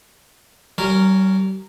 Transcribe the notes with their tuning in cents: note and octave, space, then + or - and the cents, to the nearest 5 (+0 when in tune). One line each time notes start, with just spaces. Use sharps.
G3 -40 C#4 +0 A#4 -10